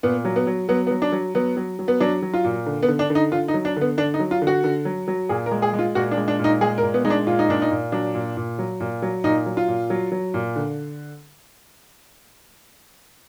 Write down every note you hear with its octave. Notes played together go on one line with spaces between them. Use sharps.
A#2 B3
F#3
B3
F#3
F#3 B3
B3
F#3
D4
F#3
F#3 B3
F#3
F#3
B3
F#3 D4
F#3
F4
A#2
D3
B3
D3
D4
D3
D#4
D3 F4
D#4
F#3
D4
D3 B3
D3 D4
D#4
F#3
F4
D3
F#4
D3
F#3
F#3
A#2 G#4
A#4
G#3
G#4
G#3
F4
A#2 F#4
D4
G#3
D4
A#2
D#4
G#3 G#4
A#4
A#2
B3
G#3 D#4
D4
A#2 F4
D#4
A#2 D4
D#4
A#2
F#3 D4
A#2
A#2
F#3
A#2
F#3
A#2 D#4
F#3
F4
A#2
F#3
F#3
A#2
D3